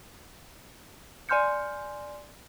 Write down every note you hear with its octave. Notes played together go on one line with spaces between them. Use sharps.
D5 G#5 C6 F6 G6 C#7